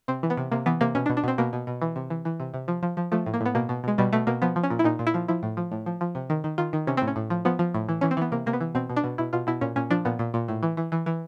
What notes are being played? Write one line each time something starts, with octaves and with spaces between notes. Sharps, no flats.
C3 C4
E3
B3
C3
C3 A#3
E3 B3
C3 A#3
B2 C#4
D4
B2
D4
B2 C4
B2 A#3
B2
B2
E3
C3
E3
E3
C3
C3
F3
F3
F3
F3 A3
A2
A#3
A2 B3
B2 A#3
B2
B2 G#3
B2 G3
B2 A3
B2 A#3
F3 B3
F3
C#4
A#2
E4
A#2 D#4
A#2
E4
F3
F3 E4
A2
F3
A2
F3
F3
C3
D#3
D#3
D#3 F4
D#3
C3 C#4
A2 C4
C#4
A2
F3
F3 B3
F3
A2
E3
E3 C#4
C4
E3 B3
C3 A#3
C3 A#3
B3
E3
B2 C4
B2
D4
B2
B2 E4
B2 F4
B2 E4
A#2 C#4
A#2 C#4
F3 D4
A#2 B3
A#2
A#2
A2
E3
E3
E3
E3